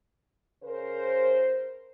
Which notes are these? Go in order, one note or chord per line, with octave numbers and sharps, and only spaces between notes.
C#3 A#4 C5